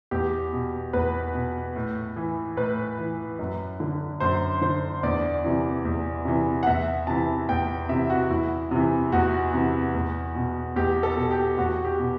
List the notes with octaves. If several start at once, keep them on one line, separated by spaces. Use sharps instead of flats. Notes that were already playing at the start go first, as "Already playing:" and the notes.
E2 G4
B2
E2 B4
B2
A2
E3
A2 B4
E3
F#2
D3
F#2 C5
D3 C5
E2 D5
C3 E3
E2
C3 E3
F#5
E2 E5
C3 E3 A5
E2 G5
C3 E3 E5
F#4
E2 E4
C3 E3
E2 F#4
C3 E3
E2
B2
E2 G4
A4
B2
G4
E2 F#4
G4
B2